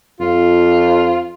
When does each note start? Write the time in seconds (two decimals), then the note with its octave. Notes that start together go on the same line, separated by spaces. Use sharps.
0.20 F2 F4